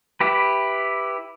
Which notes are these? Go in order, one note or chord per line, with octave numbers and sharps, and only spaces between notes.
E4 G4 B4